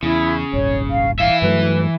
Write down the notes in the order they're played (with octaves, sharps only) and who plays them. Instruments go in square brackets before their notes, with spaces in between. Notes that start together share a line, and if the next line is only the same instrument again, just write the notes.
[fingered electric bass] E2 [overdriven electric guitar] C#3 [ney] E4
[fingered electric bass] D#1 G#1 [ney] C#5
[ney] F5
[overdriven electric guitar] E3 E5 [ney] F5
[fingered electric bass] G2 F#3 A3 [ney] B4